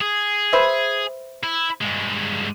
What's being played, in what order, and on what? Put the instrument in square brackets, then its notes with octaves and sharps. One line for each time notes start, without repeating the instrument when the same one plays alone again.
[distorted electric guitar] G#4
[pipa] B4 C5 E5
[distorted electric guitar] E4
G2 G#3